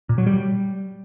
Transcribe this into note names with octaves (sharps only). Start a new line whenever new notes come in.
A#2
F#3
G3